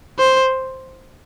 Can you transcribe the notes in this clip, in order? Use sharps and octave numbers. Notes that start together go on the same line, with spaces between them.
C5